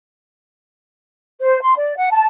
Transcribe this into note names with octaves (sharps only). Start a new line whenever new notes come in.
C5
C6
D5
F#5
A5